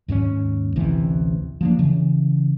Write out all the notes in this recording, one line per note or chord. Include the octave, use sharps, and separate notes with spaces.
D#2 G#2 A3 C#4
A1 D2 C3 E3
F3 A#3 D4
C#3 E3